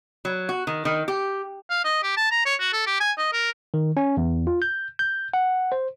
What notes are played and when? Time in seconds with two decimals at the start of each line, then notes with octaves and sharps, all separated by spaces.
0.25 F#3
0.49 F#4
0.67 D#3
0.85 D#3
1.08 G4
1.70 F5
1.84 D#5
2.03 G4
2.17 A5
2.31 A#5
2.46 C#5
2.60 F#4
2.73 A4
2.86 G4
3.00 G#5
3.18 D#5
3.33 A#4
3.74 D#3
3.97 C#4
4.17 E2
4.47 F4
4.62 G6
4.99 G6
5.34 F#5
5.72 C5